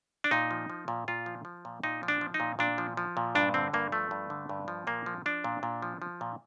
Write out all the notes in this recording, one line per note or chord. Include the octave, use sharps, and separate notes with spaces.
D4
A#2 D#4
F3
F3
A#2
A#2 F4
F3
F3
A#2
A#2 D#4
F3
D4
F3
D#4
A#2
A#2 D4
F3
F3
A#2
G2 D4
D3 C4
G2 A#3
F3 A3
G2
D3
G2
F3
A#2 A#3
F3
F3 D4
A#2
A#2
F3
F3
A#2